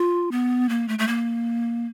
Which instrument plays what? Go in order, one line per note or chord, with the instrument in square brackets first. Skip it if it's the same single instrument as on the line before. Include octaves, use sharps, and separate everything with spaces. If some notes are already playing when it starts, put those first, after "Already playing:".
Already playing: [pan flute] F4
B3
A#3
A3
A3
A#3